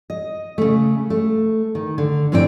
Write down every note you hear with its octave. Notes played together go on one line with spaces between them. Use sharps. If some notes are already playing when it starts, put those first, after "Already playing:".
D#5
C#3 A3
A3
D#3
D3
F#2 A2 C4 D4 G4 G5